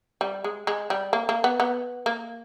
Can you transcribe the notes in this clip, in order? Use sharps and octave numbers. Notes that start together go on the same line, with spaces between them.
G3
G#3
G#3
G3
A#3
A#3
B3
B3
A#3